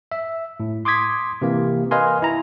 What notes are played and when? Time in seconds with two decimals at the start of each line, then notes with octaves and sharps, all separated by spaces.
0.12 E5
0.60 A2
0.85 C6 D6 D#6 G#6 B6
1.42 C3 E3 A#3
1.91 A#4 B4 D#5 F5 G#5 C6
2.22 E4 A#5